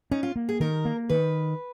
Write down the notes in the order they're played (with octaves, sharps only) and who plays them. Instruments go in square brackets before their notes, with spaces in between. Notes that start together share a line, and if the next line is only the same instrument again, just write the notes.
[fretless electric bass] C#4 [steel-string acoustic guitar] D#4
[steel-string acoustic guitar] F4
[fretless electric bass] A#3
[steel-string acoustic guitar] G#4
[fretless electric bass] D#3 [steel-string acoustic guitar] A#4
[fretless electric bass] A#3
[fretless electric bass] D#3 [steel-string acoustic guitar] B4